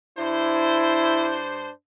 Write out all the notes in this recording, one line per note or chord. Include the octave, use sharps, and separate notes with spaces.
G2 D4 E4 C5